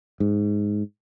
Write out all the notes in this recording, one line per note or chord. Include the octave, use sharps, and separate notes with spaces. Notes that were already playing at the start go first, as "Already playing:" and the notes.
G#2